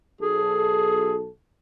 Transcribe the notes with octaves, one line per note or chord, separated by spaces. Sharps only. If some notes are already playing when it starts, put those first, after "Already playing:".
B1 G#4 A4